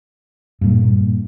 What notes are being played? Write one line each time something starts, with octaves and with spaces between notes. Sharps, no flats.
G2 A#2